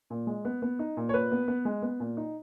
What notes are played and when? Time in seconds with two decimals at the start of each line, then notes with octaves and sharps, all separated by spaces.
0.10 A#2
0.27 G#3
0.45 B3
0.62 B3
0.79 D#4
0.97 A#2
1.09 C#5
1.14 A#2 B4
1.32 B3
1.48 B3
1.65 G#3
1.82 B3
2.00 A#2
2.17 D#4